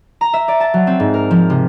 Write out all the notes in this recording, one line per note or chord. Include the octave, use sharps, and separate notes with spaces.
A#5
E5
D5
A5
F#3
C4
G#2
A#4
F3
C3